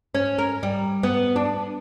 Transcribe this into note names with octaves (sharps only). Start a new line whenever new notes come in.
C#4
A#4
G3
B3
D4